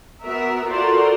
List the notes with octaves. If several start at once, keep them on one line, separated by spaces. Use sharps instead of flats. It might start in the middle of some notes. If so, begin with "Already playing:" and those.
B3 F#4 A#4 E5
F4 F#4 A4 A#4 C5 D5